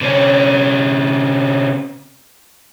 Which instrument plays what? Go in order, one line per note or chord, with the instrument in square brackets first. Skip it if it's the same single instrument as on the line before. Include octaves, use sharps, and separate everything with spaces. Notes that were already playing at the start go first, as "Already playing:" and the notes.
[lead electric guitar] C3 C#4